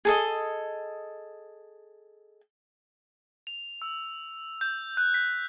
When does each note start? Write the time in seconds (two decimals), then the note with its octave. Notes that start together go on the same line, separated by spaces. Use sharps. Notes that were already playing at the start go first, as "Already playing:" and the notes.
0.05 G#4 A4 D#5
3.47 F7
3.82 E6
4.61 G6
4.97 F#6
5.14 B6